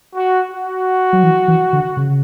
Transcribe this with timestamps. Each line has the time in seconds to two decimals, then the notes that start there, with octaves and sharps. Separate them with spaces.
0.14 F#4
0.51 F#4
1.13 F#3
1.23 E3
1.48 E3
1.73 D3
1.97 C#3